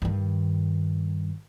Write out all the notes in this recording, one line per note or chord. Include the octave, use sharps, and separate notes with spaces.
G2 D#3